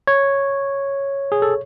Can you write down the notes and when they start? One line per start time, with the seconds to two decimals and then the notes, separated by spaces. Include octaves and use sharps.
0.07 C#5
1.32 G#4
1.42 A4